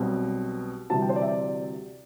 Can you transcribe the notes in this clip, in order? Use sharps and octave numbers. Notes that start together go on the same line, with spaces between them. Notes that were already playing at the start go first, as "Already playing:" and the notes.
Already playing: B1 B2 G3 C4
D2 C3 E3 G3 C4 A5
G5
C5
D5
E5
D5